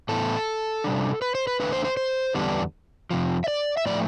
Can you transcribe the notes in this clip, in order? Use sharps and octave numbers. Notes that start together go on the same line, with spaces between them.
A2 E3 B3 E4 A4
C3 G3 D4
B4
C5
B4
E2 D3 A3 D4 B4
C5
C5
C5
E2 D3 G3 B3 D4
F2 C3 F3
E5
D5
E5
A2 F3 A3 D5